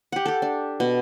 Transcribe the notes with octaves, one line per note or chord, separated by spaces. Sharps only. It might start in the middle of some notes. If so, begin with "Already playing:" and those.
G4 F#5
G4 A4
D4
B2